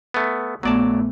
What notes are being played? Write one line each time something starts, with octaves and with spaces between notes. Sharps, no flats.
A3 B3
A#1 A#2 F#3 A3 B3 D5 A5